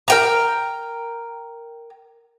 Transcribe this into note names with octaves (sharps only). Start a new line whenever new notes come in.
A#4 G5 A#5